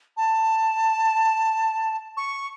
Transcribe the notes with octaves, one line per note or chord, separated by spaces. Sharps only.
A5
C#6